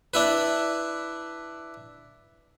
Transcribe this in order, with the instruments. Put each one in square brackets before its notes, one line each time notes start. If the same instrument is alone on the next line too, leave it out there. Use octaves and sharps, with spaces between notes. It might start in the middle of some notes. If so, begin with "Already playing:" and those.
[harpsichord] D4 E4 B4